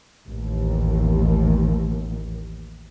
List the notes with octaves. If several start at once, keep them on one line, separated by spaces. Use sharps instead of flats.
A1 D#2